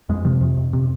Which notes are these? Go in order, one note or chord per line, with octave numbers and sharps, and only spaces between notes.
F2 G#3
C3 F3
F2
F2
C3